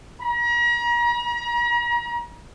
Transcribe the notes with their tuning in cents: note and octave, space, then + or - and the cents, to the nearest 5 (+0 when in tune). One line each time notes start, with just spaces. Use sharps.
A#5 +40